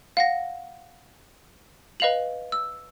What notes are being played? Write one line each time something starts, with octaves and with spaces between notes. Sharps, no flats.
F5 F#5 A#6
B4 D#5 F5 F7 F#7
E6